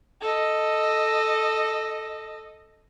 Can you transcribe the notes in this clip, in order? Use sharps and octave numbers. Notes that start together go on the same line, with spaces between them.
A4 D#5